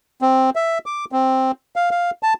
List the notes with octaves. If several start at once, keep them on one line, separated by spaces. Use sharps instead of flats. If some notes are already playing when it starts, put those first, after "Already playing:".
C4
E5
D6
C4
F5
F5
A5